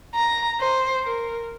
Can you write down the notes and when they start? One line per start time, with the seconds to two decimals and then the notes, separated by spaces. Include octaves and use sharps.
0.15 A#5
0.60 C5
1.05 A#4